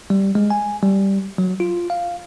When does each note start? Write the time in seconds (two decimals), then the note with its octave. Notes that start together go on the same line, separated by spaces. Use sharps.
0.10 G3
0.35 G#3
0.50 G#5
0.83 G3
1.38 F#3
1.60 F4
1.90 F5